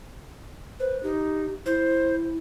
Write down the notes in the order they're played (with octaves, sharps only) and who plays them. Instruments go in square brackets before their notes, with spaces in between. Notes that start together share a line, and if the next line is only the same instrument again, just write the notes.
[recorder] B4 [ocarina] C5
[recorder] D#4 [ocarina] G4
[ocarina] E4 [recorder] C5